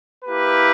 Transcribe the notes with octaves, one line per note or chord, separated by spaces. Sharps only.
A#3 E4 G4 B4